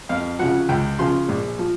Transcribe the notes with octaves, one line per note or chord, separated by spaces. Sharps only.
F2 F5
C#3 F3 F#5
C#2 G5
C#3 F3 C6
A#1
F3